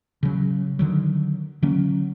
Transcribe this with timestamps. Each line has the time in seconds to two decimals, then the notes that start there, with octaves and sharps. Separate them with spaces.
0.23 C#3 F#3
0.79 D3 D#3 F#3
1.62 D3 F#3 A#3 C#4